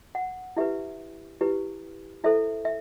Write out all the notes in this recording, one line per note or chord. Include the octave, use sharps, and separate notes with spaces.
F#5
E4 G4 B4 E5
E4 G4 B4
E4 A4 C5 E5
E5